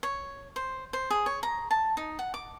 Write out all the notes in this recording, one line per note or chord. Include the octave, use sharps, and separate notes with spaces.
C#5
C5
C5
G#4
C#5
A#5
A5
D#4
F#5
D6